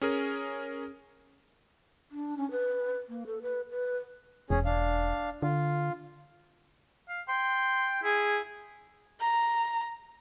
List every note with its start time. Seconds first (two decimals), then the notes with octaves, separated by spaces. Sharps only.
0.01 C#4 G#4 A#4
2.11 D4
2.38 C#4
2.51 B4
3.09 A#3
3.27 A4
3.42 B4
3.71 B4
4.50 E1 C#4 G#4
4.65 D4 F5
5.42 D3 F4
7.09 F5
7.28 G5 C6
8.03 E4 G#4
9.20 A#5